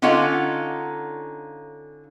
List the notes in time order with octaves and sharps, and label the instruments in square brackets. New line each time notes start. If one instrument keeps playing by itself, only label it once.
[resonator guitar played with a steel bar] D3 C#4 D#4 F4 A4 F#5